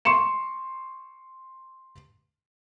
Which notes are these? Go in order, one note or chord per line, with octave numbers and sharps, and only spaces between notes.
C6 C#6 C#7 E7